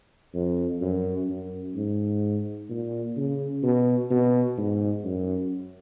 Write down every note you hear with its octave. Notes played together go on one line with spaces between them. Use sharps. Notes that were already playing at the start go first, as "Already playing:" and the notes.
F2
F#2
F#2
G#2
A#2
C#3
B2
B2
G#2
F#2